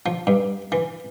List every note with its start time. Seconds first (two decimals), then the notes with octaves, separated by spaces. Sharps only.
0.06 F3
0.27 G2
0.72 E3